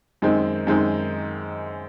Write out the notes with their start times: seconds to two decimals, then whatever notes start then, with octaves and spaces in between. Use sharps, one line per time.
0.22 F#2 D#3 G#3 C4 D#4
0.67 F#2 D#3 G#3 C4 D#4